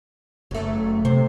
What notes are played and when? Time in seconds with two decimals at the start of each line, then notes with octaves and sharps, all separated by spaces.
0.51 F#1 F#3 A3
1.05 C3 C5